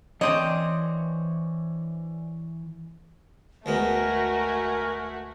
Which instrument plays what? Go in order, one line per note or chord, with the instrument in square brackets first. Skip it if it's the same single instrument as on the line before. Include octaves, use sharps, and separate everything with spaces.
[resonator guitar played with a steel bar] D3 C4 D#5 [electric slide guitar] E3 C#5
[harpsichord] D2 G#3 B3 [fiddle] A3 F#4 [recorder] A#4 [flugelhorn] G#5